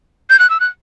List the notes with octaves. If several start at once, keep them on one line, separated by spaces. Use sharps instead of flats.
G6
F#6
E6
F#6